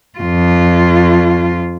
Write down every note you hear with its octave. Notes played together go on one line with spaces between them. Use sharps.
F2 F4